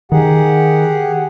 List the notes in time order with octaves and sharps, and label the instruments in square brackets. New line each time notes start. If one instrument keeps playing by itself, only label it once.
[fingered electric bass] D#3 [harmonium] G4 G#4 F#5